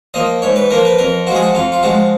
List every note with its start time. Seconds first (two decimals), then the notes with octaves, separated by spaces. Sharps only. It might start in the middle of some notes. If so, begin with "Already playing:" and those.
0.14 F3 A#3 D#5
0.42 G#2 C#5
0.56 B4
0.70 F3 A#3 A#4
0.85 B4
0.99 F2 A#4
1.27 F3 F#4
1.31 G#3 G#4
1.42 F#4
1.54 F2 F4
1.72 F4
1.83 F3 G#3 F#4